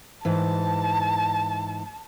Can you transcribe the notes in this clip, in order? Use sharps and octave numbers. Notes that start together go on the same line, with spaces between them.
G#2 E3 A5